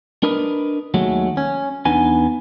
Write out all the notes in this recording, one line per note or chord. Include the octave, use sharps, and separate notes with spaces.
D4 A#4 B4 D#5
D#2 F#3 G#3 A3
C#4
E2 B3 D4 D#4 G#5